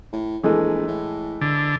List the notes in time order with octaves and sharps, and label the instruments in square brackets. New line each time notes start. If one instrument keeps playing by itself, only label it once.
[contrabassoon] A2
[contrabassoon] A#1 [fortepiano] E3 G#3 A3
[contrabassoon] A2
[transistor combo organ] D3